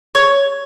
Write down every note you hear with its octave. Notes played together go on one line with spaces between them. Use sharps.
C#5